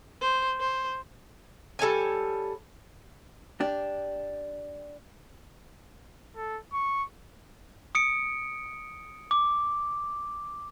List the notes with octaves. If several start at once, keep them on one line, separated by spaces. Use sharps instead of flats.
C5
C5
G3 A4 C#5 G#5
D4 G4
A4
C#6
D#6 C#7 D7
D6